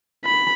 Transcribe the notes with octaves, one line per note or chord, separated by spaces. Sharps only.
B5